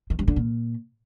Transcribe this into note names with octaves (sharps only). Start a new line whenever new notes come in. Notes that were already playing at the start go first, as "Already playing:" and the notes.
D#3
G2
D3
A#2